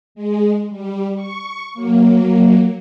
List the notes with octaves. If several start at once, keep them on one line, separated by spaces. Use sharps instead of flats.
G#3
G3
C#6
F#3 A#3